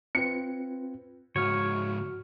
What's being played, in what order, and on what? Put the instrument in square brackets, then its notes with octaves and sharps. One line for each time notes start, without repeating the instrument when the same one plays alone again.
[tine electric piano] C4 F4 B4 [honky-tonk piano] C#7
[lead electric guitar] C#2 G#2 [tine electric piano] F#4 F6 [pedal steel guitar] C#5